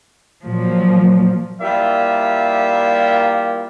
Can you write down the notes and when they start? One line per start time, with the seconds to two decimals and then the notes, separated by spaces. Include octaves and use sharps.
0.46 A#2 F3 F#3
1.61 G3 A#3 E4 F4 D5 E5